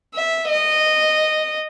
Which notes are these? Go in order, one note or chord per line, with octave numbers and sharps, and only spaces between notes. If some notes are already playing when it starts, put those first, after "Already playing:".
E5
D#5